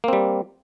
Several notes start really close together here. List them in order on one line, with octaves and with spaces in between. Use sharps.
A#3 C4 G3